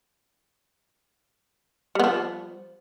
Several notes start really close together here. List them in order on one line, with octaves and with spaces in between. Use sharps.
G3 B3 F3